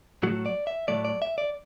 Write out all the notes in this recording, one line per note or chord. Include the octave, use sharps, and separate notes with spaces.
A2 F#3 A3 F#4
D5
E5
A2 F#3 A3 D5
D5
E5
D5